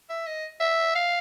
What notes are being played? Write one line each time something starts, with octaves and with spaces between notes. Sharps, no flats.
E5
D#5
E5
F5